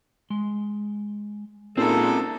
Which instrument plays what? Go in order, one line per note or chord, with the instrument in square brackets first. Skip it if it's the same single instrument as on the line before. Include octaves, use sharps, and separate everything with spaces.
[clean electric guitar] G#3 C6
[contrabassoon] A#2 [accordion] G#3 A4 [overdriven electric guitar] C4 A#4 [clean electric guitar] C#4 D#4 E4